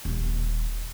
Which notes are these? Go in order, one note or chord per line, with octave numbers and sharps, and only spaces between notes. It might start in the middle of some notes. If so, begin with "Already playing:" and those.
D#1